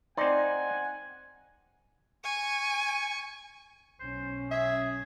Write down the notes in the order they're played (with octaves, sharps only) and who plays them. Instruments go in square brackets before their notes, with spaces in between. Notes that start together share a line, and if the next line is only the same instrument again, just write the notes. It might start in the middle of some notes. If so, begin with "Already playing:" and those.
[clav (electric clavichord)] C4 D#4 [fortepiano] D5 C6 [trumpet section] F#5 G#5
[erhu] G#5 [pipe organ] C#6
[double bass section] B1 C#4 [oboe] C5
[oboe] G#4 [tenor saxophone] E5